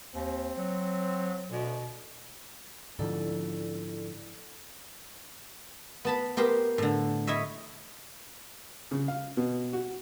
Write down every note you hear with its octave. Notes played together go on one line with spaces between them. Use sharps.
D#2 C4
F#3
D2 B2
G#2 D3 F3 E4 A4 D5
B3 A5 B5
B3 G4 A#4 C5
A2 D3
E4 C#5 D#5 E5
C#3
F5
B2
F#4